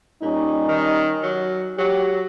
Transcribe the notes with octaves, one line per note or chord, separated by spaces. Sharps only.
A#2 G3 C#4 D#4
D#3
F#3
F#3 G4